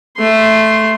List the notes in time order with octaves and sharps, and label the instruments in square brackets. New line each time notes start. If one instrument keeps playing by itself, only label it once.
[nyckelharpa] A3 C6